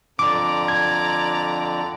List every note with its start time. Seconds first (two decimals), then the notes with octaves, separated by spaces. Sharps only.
0.19 F2 D3 D5 A#5 D6
0.68 G#6